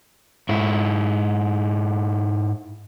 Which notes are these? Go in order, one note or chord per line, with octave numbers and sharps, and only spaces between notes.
G#2 E4